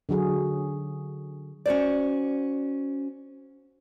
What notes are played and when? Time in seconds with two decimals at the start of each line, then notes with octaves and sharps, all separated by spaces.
0.09 D3 F#3 F#4 G#4
1.66 C#4 F#4 C5 D5